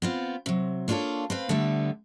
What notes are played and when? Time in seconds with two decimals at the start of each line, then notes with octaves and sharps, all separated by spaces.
0.02 B3 C4 F4
0.46 C3 F#3
0.88 A#3 D4 F4 F#4 A4 C#5
1.30 C4 B4 F5
1.49 D3 G3 A3 B3 E5